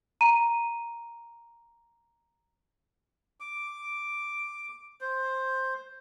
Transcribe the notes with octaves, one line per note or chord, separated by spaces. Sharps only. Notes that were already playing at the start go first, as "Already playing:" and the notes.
A#5 D#7
D6
C5